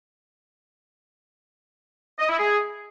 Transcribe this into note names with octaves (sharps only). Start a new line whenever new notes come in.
D#5
E4
G#4